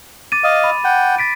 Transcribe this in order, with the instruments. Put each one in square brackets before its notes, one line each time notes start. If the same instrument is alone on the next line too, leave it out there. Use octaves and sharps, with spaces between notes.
[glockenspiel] D6 A6 D#7
[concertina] D#5 F5
[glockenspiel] B5
[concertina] F#5 G5
[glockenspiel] A6 B6 D7